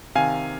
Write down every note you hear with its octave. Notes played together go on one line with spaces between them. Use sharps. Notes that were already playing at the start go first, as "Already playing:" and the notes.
C3 D#3 F5 G#5